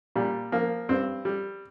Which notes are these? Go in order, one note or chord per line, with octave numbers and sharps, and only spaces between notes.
A#2 G3
F3 A#3
G2 C4
G3